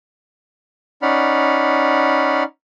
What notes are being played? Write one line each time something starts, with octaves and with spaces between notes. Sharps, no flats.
C#4 D#4 D5 F#5 B5 F6